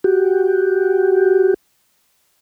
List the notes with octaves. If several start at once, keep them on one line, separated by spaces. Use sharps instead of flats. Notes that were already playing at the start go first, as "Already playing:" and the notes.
F#4 G4